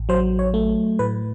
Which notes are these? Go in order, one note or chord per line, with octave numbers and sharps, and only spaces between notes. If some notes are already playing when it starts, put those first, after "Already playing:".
Already playing: A1
F#3 C5
C#5
A3
A2 B4